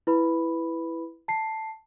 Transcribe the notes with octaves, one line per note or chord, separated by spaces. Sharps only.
E4 B4 B5
A5 C7